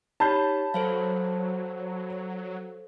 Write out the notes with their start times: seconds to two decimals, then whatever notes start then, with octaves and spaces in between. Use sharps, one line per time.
0.20 D#4 G4 C#5 A5 B5 G6
0.74 F#3 A4 C5 F5